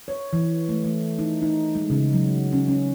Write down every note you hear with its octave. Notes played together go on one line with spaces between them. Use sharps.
C#5
E3
A3
A3
D#4
D#4
G#3
C#3
F#3
C#4
C#4